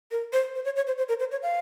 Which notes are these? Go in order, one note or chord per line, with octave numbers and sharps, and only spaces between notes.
A#4
C5
C5
C#5
C#5
C5
C5
A#4
C5
C#5
F5